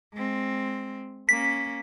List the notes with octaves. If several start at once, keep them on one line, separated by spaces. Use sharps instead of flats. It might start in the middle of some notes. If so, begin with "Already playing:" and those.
G#3 C4
A#3 C#4 B6